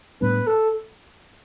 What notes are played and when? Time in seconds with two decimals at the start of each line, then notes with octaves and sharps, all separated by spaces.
0.21 A2 G3 B3 D4 B4
0.47 A4